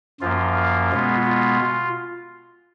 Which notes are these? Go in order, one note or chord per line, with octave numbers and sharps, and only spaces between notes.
F#2 F3 A#3 F4
B2 G#3 B3
F4